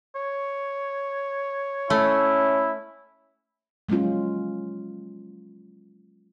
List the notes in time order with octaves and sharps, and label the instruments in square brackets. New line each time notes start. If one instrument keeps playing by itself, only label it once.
[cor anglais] C#5
[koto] A3 [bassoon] C#4 [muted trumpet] E4
[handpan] F#3 G#3 A#3 C#4 F4